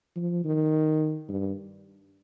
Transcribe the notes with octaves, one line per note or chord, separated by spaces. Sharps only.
F3
D#3
G2